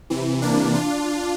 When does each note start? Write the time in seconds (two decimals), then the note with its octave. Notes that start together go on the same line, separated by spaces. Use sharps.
0.10 C3 E3
0.42 A#3 D4
0.74 D4 F4